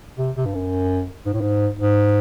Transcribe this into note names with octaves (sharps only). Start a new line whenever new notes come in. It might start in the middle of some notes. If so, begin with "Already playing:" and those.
C3
C3
G2
F#2
G#2
A2
G#2
G#2